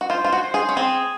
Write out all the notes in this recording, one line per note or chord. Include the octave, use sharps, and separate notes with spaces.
F#4
F4 C5
F4
F#4
C5
G#4
C#4
C4 G#4